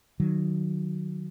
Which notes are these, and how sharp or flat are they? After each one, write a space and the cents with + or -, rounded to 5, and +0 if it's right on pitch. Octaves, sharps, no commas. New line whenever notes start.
D#3 -25 F#3 +0